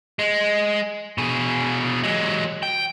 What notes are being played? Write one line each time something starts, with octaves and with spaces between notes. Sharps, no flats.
G#3
B2 G#4
F#3 G#3
G5